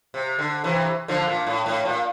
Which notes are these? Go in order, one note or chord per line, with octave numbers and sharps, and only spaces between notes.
C3
D3
C3 E3
D3 F3
A#2
A2
A2
A#2